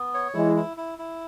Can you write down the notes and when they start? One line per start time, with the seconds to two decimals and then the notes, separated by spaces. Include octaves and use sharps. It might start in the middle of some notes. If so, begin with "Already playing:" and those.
Already playing: B3
0.14 C#5
0.34 E3 G#3 E4
0.56 E4
0.77 E4
0.99 E4